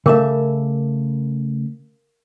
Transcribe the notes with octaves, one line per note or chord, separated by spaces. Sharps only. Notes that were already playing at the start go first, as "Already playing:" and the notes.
C#3 A3 A#4 E5 F5 D6